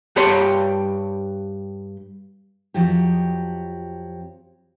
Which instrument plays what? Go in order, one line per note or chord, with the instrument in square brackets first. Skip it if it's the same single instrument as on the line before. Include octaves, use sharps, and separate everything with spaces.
[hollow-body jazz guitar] G2 G4 C#5 C6
[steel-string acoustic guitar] F2 G#2 F3 F#3 G4